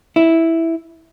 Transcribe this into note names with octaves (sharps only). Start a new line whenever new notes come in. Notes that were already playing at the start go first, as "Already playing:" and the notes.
E4